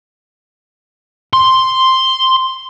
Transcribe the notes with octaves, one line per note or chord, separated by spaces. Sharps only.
C6